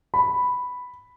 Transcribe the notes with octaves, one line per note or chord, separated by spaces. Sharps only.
B5